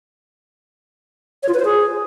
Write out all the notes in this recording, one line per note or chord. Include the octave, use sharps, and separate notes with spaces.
C#5
F4
B4
C5
G#4